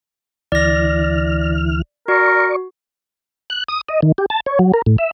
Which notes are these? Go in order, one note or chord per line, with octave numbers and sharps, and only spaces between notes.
D2 E3 D5 F6 A#6
F#4 A#4 D5 C#6
F#6
D#6
D#5
D#3
G4
A5
C#5
F#3
A#4
A2
E5